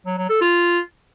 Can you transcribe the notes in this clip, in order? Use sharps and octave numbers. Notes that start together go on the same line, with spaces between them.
F#3
F#3
A4
F4